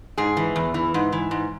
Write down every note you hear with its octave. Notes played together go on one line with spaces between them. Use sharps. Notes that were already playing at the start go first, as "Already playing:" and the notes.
G#2 G#4
E3
E2
E3
G#2
E3
G#2